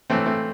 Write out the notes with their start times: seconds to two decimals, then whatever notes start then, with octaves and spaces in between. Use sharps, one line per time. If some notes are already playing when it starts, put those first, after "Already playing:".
0.10 A2 E3 A3 C4
0.26 A3 C4